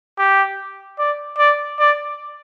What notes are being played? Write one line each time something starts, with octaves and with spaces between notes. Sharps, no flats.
G4
D5
D5
D5